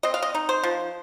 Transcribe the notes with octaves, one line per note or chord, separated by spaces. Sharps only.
C4 D#5
F5
D#5
D#4
C5
F3